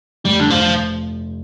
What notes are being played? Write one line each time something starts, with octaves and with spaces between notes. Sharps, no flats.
F1 G3
D3
F1 F3
C3